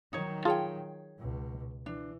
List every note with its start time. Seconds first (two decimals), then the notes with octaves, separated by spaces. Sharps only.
0.13 D#3 F#3 D#4 C#5
0.45 F4 G#4 C#5 G5 A5
1.19 C#2 B2
1.86 E3 D4